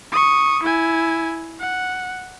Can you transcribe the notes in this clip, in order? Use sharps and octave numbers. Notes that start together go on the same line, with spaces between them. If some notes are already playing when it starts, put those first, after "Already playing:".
C#6 D#6
E4 G#5
F#5